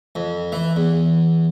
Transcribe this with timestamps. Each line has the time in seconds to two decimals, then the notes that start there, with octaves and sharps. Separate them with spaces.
0.15 F2
0.52 E3
0.76 E2